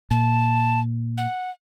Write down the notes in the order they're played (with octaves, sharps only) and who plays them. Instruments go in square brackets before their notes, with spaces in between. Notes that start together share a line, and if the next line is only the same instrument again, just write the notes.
[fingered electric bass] A#2 [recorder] A5
[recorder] F#5